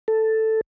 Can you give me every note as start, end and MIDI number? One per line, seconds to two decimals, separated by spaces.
0.08 0.61 69